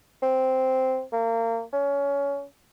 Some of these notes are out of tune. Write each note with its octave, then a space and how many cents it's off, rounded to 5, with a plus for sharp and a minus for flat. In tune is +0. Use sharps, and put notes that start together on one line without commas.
C4 -5
A#3 -30
C#4 +20